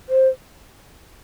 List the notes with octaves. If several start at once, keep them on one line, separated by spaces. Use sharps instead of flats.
C5